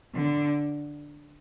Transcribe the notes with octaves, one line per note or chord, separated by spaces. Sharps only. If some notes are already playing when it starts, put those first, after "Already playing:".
D3